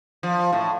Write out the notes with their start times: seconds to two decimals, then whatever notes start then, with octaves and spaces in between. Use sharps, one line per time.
0.23 F3
0.53 A2